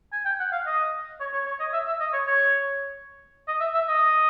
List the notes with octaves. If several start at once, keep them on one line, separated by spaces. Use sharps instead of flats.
G#5
G5
F#5
F5
D#5
C#5
C#5
C#5
D#5
E5
E5
D#5
C#5
C#5
D#5
E5
E5
D#5